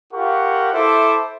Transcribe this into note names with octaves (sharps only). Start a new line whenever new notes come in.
F4 G4 A#4 F#5 C#6
E4 A4 C5 E5 A5 D6